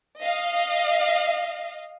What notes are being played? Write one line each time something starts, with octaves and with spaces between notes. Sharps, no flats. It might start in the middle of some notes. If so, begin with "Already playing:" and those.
D#5 F5